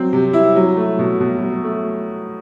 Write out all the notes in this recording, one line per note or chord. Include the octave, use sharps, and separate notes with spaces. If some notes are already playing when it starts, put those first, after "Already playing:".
Already playing: F#3 C4
C3
E4
F#3
A3
B2
B2
F#3
A3